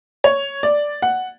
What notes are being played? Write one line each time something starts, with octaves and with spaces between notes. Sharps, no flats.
C#5
D5
F#5